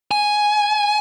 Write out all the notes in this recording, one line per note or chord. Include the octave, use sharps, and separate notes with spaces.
G#5